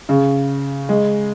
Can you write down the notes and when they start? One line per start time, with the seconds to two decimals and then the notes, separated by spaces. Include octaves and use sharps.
0.09 C#3
0.89 G#3